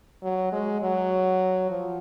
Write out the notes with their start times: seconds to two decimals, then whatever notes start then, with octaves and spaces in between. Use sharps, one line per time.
0.23 F#3
0.52 G#3
0.81 F#3
1.70 F3